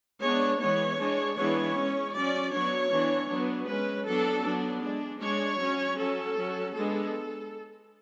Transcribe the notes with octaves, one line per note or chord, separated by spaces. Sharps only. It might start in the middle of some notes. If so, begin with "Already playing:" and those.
G#3 B3 D4 C#5
E3 G#3 B3 C#5
G#3 D4
E3 G#3 B3 D4 C#5
G#3 C#4
F#3 C#4 D5
F#3 B3 D4 C#5
E3 B3 D4
F#3 B3 D4
G#3 C#4 B4
F#3 B3 D4 A4
F#3 B3 D4
G#3 D4
G#3 D4 C#5
F#3 C#4
F#3 C#4 A4
F#3 C#4
G#3 B3 D4 A4